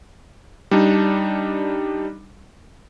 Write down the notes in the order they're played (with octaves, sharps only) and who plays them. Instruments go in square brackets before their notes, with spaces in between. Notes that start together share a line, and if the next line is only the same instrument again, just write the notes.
[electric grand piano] G3 D4 D#4